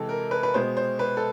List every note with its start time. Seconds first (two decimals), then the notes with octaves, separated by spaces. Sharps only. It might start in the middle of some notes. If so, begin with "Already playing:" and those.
Already playing: C3 E3 G#3 A4
0.09 A#4
0.31 B4
0.43 B4
0.54 B2 G#3 B3 C5
0.77 C5
0.99 B4
1.17 A4